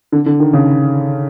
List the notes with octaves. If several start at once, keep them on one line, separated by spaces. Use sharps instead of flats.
D3
D3
D#3
C#3